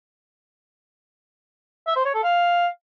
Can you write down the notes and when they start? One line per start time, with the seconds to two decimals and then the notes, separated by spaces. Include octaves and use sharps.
1.87 E5
1.96 C5
2.05 C#5
2.14 A4
2.23 F5